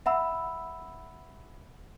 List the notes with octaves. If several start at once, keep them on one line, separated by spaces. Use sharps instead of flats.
E5 F#5 B5 E6